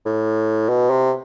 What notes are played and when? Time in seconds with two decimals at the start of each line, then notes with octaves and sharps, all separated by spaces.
0.06 A2
0.69 B2
0.90 C3